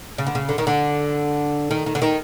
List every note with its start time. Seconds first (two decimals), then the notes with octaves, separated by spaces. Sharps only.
0.18 C#3
0.27 D3
0.35 C#3
0.49 D3
0.58 D#3
0.67 D3
1.71 D#3
1.86 D#3
1.95 D3
2.02 D#3